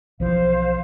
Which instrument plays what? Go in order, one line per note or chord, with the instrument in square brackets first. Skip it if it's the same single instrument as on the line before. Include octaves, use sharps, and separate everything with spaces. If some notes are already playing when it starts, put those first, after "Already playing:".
[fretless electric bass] B1 E3 F3 [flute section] C5 F5